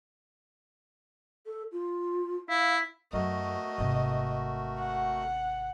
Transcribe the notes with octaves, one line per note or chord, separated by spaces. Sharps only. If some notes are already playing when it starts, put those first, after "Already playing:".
A4
F4
E4 F5
F#2 F#3 A3 F#4 A#4 D#5
G#1 C3
F#5